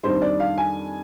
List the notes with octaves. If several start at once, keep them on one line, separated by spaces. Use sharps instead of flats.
F2 D#3 G3 D4 C5
D5
F5
G#5